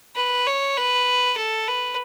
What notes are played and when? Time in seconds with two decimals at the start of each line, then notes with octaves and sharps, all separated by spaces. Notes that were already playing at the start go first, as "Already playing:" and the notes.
0.16 B4
0.47 C#5
0.77 B4
1.38 A4
1.68 B4